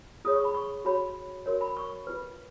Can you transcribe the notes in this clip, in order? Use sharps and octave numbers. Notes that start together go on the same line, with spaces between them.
F4 G#4 C#5 D#6
C#6
B5
C#6
F#4 C#5 B5
F#4 A#4 C#5
B5
C#6
F4 B4